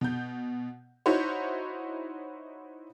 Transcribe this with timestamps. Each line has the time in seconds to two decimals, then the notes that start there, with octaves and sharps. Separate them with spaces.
0.01 B2 G6
1.06 D#4 E4 F#4 C5 C#5